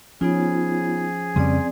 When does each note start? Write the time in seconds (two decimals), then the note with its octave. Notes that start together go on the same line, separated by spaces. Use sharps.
0.21 F3 B3 C#4 D#4 F4 G#4
1.36 F2 C#3 G3 C4 D5